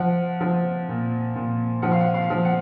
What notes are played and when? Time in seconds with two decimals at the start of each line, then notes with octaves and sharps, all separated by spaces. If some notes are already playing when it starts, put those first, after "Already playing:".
Already playing: F3 F#5
0.41 F3
0.89 A#2
1.36 A#2
1.82 F3 F#5
1.92 F5
2.01 F#5
2.14 F5
2.30 F3
2.45 F#5